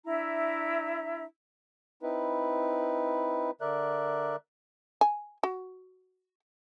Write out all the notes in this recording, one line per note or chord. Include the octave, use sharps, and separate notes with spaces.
D4 E4 E5 A#5
C4 D#4 E4 B4
D3 A#4 D5 E5 F#6
G#5
F#4